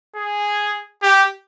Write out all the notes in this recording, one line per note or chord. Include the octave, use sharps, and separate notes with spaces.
G#4
G4